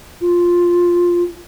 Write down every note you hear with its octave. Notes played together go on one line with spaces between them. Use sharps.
F4